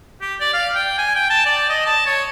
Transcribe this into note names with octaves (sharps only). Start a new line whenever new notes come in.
G4
D5
F5
G5
G#5
G5
A5
D5
D#5
A5
C#5